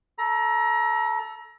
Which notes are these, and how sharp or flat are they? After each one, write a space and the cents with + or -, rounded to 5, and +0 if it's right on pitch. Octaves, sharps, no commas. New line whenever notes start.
A4 +0 A#5 +30